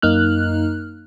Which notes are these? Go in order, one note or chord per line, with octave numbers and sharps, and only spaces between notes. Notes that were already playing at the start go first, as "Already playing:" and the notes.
F#2 A#3 D#4 F6 F#6